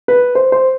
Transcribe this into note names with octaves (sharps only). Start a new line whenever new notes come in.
B4
C5
C5